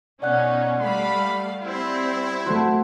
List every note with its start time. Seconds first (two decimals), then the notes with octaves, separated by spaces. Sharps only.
0.22 B2 C#4 D#4 D5 F#5 F#6
0.81 G3 A3 F5 B5
1.63 G3 C4 E4
2.46 A3 F#4 C5 C6